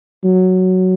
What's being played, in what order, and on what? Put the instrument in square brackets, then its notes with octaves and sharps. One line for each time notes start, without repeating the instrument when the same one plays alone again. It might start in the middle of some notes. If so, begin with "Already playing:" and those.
[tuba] F#3